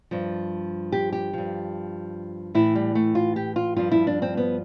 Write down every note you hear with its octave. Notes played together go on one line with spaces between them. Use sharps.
G2 F3
G4
G4
G2 F3
A2 E3 E4
G3
A3
F4
G4
F4
G2 F3 F4
E4
D4
C4
B3